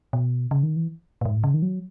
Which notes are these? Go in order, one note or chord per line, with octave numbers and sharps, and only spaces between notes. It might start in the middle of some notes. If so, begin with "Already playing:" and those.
B2
C#3
D#3
E3
A2
G#2
A2
C#3
D#3
F#3